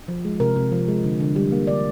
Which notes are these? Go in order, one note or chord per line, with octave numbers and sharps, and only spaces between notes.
F3
G#3
C3 A#4
C3
F3
G#3
D3
D3
G3
A#3
D3 D5